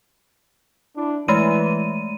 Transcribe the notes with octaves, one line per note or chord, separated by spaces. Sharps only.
D4 E4
E3 G#3 A3 D#7